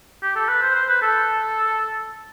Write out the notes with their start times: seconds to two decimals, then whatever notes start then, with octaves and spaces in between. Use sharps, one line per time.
0.23 G4
0.36 A4
0.49 B4
0.62 C5
0.76 C5
0.89 B4
1.02 A4